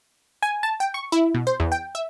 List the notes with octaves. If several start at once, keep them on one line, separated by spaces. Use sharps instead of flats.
G#5
A5
G5
C#6
E4
B2
C5
E2
G5
E5